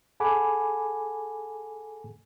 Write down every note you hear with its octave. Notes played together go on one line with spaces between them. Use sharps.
G#4 A4 F#5 G#5 B5 D6